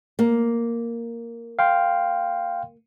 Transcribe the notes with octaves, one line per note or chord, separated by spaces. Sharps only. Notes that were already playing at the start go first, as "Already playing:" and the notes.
A#3
F5 G5 C6